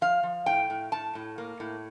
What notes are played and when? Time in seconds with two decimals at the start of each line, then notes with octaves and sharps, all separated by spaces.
0.01 F3 F5
0.23 F3
0.46 A2 G5
0.70 A2
0.92 A2 A5
1.15 A2
1.38 A#3
1.60 A2